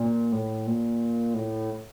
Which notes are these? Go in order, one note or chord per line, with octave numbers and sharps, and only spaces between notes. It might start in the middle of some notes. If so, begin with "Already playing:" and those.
Already playing: A#2
A2
A#2
A2